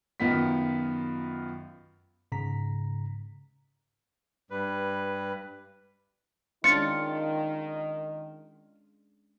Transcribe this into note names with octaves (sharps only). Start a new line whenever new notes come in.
F#2 D#3 B3 F4 B6
G#2 C#3 A#5 B6
G2 G3 B4
D#3 G#3 C#4 D4 F4 A6 C#7